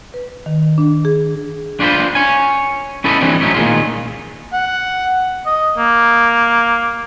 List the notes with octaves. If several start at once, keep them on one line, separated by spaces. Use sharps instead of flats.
B4
D#3
D4
G#4
D4 F4 G4 B4 C5
C#5 G#5
C#4 E4 A4 B4 D#5
E3 G3 G#3 C4 D4
A2 F#3 A3 C#4 D#4
A#2 D#3 G#3 F4
F#5
D#5
A#3